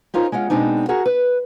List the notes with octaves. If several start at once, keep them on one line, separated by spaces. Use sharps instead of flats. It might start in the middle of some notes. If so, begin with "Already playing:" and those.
C#4 D#4 F4 A#4 C5
G#3 C#4 F4 F#5
B2 G#3 C4 D4 D#4
F#4 G#4 A#4 F#5
B4